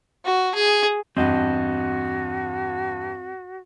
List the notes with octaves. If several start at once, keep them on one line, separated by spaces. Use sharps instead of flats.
F#4
G#4
E2 G2 C4 F#4 D#5